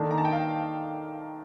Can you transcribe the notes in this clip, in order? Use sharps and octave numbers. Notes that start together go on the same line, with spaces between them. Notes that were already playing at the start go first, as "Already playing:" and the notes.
Already playing: D#3 A#3 D4 A4 A5
A#5
A5
G5
F5